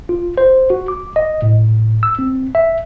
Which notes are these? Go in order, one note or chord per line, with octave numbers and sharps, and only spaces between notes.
F4
C5
F#4
D6
D#5
A2
E6
C4
E5